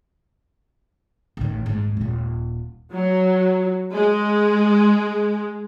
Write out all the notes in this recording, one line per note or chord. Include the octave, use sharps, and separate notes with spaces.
A1 D#3
G#1 G#2
D#1 F4
F#3
G#3